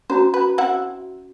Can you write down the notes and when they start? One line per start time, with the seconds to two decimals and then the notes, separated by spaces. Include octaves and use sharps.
0.10 C#4 F#4 C5 A#5
0.34 B4
0.58 C4 E4 F#5